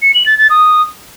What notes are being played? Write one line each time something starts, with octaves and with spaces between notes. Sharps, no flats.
C#7
F#7
A6
A6
D#6